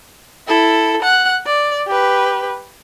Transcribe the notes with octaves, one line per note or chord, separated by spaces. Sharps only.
E4 A4
F#5 F#6
D5
G4 B4